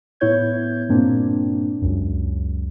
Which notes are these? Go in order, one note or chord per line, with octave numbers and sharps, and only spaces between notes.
A2 B3 E4 C#5 G6 G#6
G2 A#2 A#3 C4 D4
C#2 F#2